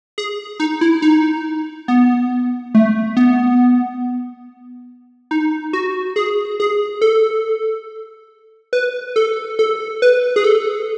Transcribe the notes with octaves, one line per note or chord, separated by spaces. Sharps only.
G#4
D#4
E4
D#4
B3
A3
B3
D#4
F#4
G#4
G#4
A4
B4
A4
A4
B4
G#4
A4